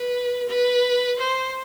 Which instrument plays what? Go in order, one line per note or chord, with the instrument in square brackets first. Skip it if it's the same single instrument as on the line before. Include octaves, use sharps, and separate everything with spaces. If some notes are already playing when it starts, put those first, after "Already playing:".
Already playing: [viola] B4
B4
C5